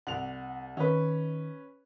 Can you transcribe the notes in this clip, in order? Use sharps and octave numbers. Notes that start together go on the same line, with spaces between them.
C2 F#5 F7
D#3 C#4 B4